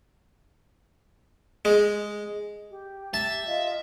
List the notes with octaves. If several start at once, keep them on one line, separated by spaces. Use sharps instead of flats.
G#3
G4
E5 A5
F4 D#5